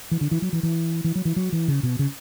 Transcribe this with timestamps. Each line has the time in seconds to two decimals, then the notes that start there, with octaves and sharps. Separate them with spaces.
0.11 E3
0.21 D3
0.31 E3
0.42 F#3
0.53 E3
0.63 E3
1.04 E3
1.15 F#3
1.25 E3
1.36 F#3
1.52 E3
1.68 C#3
1.83 B2
1.99 C#3